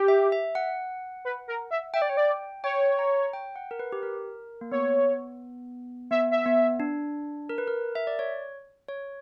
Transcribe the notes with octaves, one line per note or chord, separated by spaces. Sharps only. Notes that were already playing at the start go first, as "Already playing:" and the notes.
Already playing: G4
E5
E5
F#5
B4
A#4
E5
E5 G5
D5
C#5
D5
C#5 G5
A#5
G5
F#5
A#4
B4
G4
A#4
A#3
B3 C#5
B3 E5
E5
B3
D4
A#4
B4
A#4
E5
D5
C#5
C#5